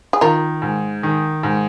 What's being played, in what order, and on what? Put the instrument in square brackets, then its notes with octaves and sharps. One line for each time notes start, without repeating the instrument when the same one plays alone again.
[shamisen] G#4
[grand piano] D#3 [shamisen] F4 A#4
[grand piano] G#2
D#3
G#2